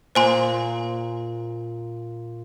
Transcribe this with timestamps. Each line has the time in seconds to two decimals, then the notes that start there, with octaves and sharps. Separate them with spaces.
0.15 A#2 C5 G#5 C6